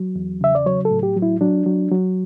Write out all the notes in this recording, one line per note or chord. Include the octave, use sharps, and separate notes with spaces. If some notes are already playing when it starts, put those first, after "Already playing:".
Already playing: F#3
E2
C#3 E5
D5
F#3 C#5
A4
A2
G4
F#3
E4
F#3 D4
F#3
F#3